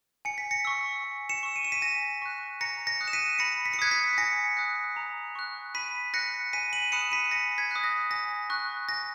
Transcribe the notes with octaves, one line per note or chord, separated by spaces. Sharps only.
G#5 C#7
B6
A#6 C#7
C#6 E6
G#5
C#7 E7
C#6 E6
D#7
E7
B6 D#7
G#5 A#6
C#6 F#6
A#5 A#6 C#7
A#6 C#7
D#6 F#6
E7
B6 D#7
B5 A#6 C#7
B6
C#7
D#6 F#6 G#6 B6
G#6 B6
B6
G#5 A#6 C#7
D#6 F#6
A#5
C#6 F#6
B5 B6 D#7
F#6 A#6 C#7
G#5 B6 D#7
D#7 F#7
B5 D#6 F#6 C#7 E7
B6 D#7
G#5 A#6 C#7
G#6 B6
D#6 F#6
A#6
G#5 A#6
C#6 F#6
G#5 A#6